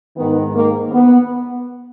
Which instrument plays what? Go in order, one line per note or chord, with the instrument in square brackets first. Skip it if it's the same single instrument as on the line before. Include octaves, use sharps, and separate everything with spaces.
[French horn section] G#2 D#3 B3
A#3
B3